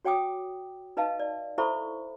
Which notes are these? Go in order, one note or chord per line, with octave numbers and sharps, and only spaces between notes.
F#4 C#5 G5 G#5 D6 D#6
D#4 B4 D#5 F5 A5
D5
E4 A4 C5 E5 B5 C#6